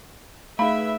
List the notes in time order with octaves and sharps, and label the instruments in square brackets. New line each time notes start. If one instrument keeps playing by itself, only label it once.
[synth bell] A3 D#4 D7 [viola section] G#4 B4 E5 [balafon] F5 [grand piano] B5